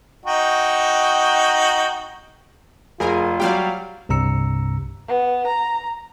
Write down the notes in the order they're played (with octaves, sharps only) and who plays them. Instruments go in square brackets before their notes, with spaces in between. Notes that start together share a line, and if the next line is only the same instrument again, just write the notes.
[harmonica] D#4 F#4 G5
[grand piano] F1 [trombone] F4 [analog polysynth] G#4 A#4 G#5
[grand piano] F#3 G3 G4 [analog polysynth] D5 F5 G5
[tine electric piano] C2 G2 C3 A#5 E6 C#7
[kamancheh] B3
A#5